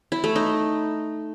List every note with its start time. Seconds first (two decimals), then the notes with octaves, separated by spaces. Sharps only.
0.12 E4
0.24 A3
0.36 D#4